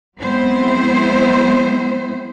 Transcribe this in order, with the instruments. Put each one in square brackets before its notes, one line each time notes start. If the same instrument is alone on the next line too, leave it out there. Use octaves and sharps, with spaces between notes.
[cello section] F#3 G#3 B3 C4 E4 C5